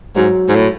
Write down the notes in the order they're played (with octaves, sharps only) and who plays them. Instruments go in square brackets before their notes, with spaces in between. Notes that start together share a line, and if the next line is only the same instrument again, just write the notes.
[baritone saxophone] G#2 [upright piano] F#3
[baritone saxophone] G#2
A2